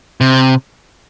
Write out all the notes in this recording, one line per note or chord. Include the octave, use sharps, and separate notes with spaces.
C3